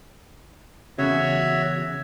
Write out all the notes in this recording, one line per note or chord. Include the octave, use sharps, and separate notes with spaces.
E2 C#3 F#4 C#5 E5